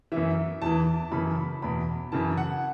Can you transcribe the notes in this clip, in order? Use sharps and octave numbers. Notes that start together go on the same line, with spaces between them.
F#2 E3 E5
E2 E3 A5
F#2 C#3 E3 B5
B5
E2 B2 B5
F#2 C#3 E3 A5
F#5